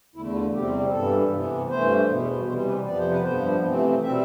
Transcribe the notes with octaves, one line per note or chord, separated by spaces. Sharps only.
E2 D3 A3 E4
F4
E2 C3 G3 C4 G4
G2 E3 B3 A4
C3 E3 B3
G2 E3 A3 C5
E2 B2 B3
C3 E3 G3 C5
B4
F2 C3 F3 B3 D5
C5
B4
G2 F3 B3 C5
C3 E3 A3 C4
B2 G3 C4 E5